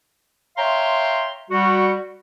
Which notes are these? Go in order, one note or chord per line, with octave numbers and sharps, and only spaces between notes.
C#5 E5 F5 G5 A#5 C6
G3 F#4